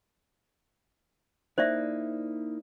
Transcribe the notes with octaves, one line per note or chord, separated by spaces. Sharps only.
A#3 D#4 E4 C5 D5 E5